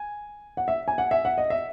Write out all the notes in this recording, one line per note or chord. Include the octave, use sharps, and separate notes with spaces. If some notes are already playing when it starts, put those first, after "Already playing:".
Already playing: G#5
F#5
E5
G#5
F#5
E5
F#5
D#5
E5